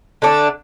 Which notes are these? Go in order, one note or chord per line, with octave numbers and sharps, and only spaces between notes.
D3 A3 D4